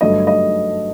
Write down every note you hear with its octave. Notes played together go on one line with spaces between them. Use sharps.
G1 G2 F#3 A3 D#5
D#5